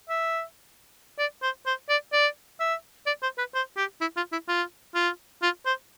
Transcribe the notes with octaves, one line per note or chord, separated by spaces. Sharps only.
E5
D5
C5
C5
D5
D5
E5
D5
C5
B4
C5
G4
E4
F4
E4
F4
F4
F4
C5